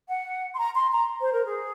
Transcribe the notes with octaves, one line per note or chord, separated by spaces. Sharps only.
F#5
C6
A#5
C6
A#5
C5
A#4
G#4